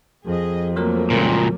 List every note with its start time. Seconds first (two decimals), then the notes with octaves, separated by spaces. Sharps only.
0.25 F2 G#4 D#5
0.76 F3 F#3 A3 A#3 A#4
1.10 C#2 A#2